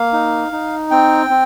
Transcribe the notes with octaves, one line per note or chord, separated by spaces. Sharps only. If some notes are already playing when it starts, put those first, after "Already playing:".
Already playing: A#3 F5
D#4
D#4
C4 G5
C4